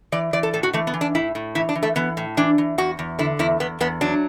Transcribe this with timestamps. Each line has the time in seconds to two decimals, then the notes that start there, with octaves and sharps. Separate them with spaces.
0.12 E3 D5
0.33 E3 D5
0.43 A4
0.53 A2 A4
0.63 F#4
0.73 E3 A3
0.87 B3
0.94 E3
1.01 D4
1.15 A2 E4
1.35 A2
1.55 E3 E4
1.69 D4
1.75 E3
1.83 A3
1.96 E3 B3
2.17 A2
2.37 E3 D4
2.58 E3
2.78 E2 F#4
2.99 E2
3.19 D3 E4
3.39 E2 E4
3.60 E2 B3
3.80 E2 B3
4.01 F#3 D4